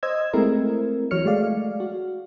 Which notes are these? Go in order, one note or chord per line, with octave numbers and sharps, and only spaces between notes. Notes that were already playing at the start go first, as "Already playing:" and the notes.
C5 D#5 E6 G#6
G#3 A3 C4 E4 A#4
E3 F#3 C#5 F6 C#7
G#3 A3 D5 F5
F#4